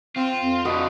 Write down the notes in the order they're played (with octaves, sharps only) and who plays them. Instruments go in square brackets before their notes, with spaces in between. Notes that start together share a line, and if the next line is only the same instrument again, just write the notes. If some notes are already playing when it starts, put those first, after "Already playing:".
[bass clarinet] C4 [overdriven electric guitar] F4
[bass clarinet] F2
[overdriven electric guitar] D3 F3 [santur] F#4 B4 D#5